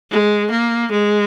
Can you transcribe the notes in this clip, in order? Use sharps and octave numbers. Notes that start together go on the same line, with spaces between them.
G#3
A#3
G#3